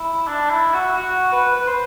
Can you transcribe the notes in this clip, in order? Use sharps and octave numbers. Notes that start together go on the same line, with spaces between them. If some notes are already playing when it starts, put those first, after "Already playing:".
Already playing: E4
D4
E4
F#4
F#4
B4
B4
C5